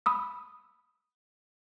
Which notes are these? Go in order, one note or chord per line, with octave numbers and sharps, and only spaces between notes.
B5 D#6 E6